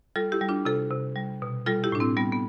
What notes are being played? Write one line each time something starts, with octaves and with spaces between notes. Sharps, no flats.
G3 F4 A4
E4 G4
G3
D4 F4
C3 F4 A4
C3
G3
B2
G3 F4 A4
E4 G4
A2 D4
C4 E4
G3 B3
B3